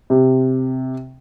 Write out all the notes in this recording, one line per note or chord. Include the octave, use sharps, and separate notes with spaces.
C3